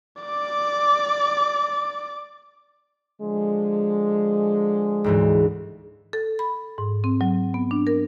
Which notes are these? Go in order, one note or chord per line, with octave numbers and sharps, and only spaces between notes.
D5 D6
D3 F3 G#3
D2 G#2 E3
A4
B5
G#2
C4
F#3
B3
D4
A#4